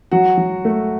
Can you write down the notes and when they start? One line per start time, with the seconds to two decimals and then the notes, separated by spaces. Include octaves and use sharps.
0.11 F#3 F#4
0.37 F#3
0.65 A3